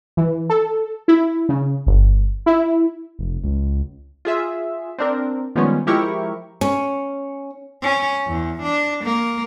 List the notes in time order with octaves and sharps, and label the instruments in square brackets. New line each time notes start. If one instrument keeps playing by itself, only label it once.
[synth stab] E3
A4
E4
C#3
G1
E4
[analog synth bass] F1
C#2
[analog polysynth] F4 G#4 E5
C4 D4 A#4
D#3 F3 G3 G#3 B3 C#4
F3 G#3 E4 G4 A#4 C#6
[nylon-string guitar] C#4
[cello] C#4
E2
D4
A#3